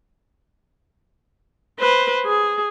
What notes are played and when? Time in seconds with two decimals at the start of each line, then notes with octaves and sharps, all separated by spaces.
1.80 B4 C5
2.25 G#4